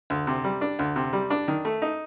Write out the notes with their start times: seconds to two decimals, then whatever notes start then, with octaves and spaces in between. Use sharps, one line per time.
0.10 D2
0.27 C3
0.44 G3
0.61 D4
0.79 D2
0.96 C3
1.13 G3
1.30 D4
1.48 D#3
1.65 A3
1.82 D#4